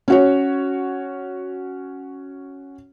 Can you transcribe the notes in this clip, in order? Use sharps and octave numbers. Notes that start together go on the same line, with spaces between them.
C#4 F#4 C#5